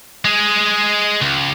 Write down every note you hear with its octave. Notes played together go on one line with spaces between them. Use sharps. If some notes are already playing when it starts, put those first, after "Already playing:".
G#3 G#4
C#2